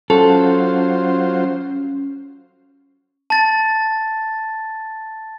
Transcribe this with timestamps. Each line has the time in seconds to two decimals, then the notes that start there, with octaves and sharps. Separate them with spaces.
0.10 F#3 C#4 F4 A4 C5
3.30 A5 A6